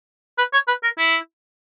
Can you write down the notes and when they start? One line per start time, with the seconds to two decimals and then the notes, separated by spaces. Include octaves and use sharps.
0.38 B4
0.53 C#5
0.68 B4
0.83 A#4
0.98 E4